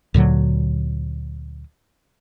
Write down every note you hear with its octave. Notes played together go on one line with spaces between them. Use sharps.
D2 A#2 D3 F#3